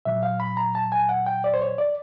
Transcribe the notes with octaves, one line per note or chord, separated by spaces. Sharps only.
A#2 F#3 E5
F5
B5
A#5
A5
G#5
F#5
G5
D5
C5
C#5
D5